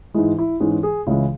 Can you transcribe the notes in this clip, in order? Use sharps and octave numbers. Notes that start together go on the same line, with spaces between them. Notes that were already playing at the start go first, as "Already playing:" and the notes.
G#2 E3 G#3 E4
E4
G#2 E3 G#3 C#4
G#4
C#2 C#3 E3 G#3 E4